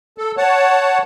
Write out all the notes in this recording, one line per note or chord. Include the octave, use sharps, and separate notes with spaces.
A4
C#5 F#5 A5